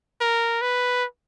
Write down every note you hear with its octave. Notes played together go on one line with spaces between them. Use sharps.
A#4
B4